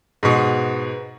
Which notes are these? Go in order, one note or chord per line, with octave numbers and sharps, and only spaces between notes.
G#2 B2